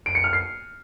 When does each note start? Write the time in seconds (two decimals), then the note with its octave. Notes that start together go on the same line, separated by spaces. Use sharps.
0.06 D7
0.15 C#7
0.24 F6
0.33 C7